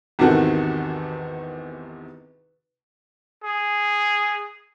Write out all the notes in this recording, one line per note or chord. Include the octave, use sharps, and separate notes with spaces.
G#1 E2 C3 D#3 F#4 A4
G#4